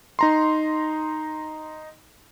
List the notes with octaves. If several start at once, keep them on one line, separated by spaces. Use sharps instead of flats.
D#4 A#5 C6